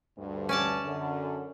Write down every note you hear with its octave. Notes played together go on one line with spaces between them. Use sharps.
D2 G2
C#4 D5 A5
F#2 D3